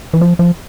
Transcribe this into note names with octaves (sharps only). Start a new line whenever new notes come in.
E3
F3
F3